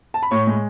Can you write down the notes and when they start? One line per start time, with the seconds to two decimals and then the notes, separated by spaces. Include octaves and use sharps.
0.14 A5
0.23 B5
0.31 A2 C#5 C#6
0.47 G#3